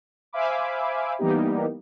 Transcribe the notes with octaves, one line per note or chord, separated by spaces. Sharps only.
C5 E5 F5 G#5 B5 D6
E3 G3 A#3 B3 D#4 G4